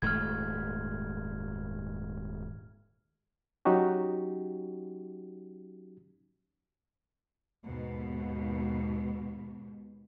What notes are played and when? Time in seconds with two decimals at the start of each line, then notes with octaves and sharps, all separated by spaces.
0.02 D#1 G#2 A3 F6 G#6
3.65 F#3 C#4 D#4 F#4 G4
7.66 D#2 G#2 B2